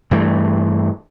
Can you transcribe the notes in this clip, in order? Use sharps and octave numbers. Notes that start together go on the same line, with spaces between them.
G2 E3 A3